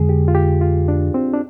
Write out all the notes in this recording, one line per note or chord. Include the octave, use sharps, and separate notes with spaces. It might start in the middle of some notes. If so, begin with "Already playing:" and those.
Already playing: F2 D3 G#3 G#4
G4
F4
G4
F4
D4
C4
D4